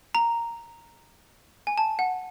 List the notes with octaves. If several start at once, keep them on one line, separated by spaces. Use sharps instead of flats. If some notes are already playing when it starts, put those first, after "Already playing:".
A#5
G#5
A5
F#5